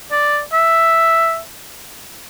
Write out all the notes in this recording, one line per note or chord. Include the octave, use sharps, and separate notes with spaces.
D5
E5